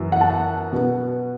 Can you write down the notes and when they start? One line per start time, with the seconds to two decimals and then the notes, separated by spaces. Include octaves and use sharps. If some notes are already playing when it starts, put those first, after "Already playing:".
Already playing: F#2 E3 B3
0.12 F#5
0.21 A5
0.30 F#5
0.73 B2 B3